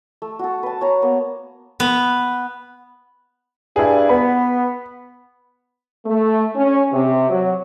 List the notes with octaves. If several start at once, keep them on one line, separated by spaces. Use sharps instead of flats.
A3
F#4 A4
B4 A5
C#5 A#5
A#3 B3
B3
G2 E4 G#4
B3 B5
A3
C#4
C3
F#3